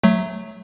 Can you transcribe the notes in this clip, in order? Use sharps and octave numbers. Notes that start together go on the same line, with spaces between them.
F#3 A3